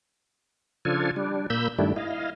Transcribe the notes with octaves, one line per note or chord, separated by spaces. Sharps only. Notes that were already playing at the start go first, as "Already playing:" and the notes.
C#3 F3 D4 F4 A4 G#5
G3 D4
A#2 A#3 B5 E6 G6
G2 D#3 G3 A3 D4 E4
E4 D#5 F5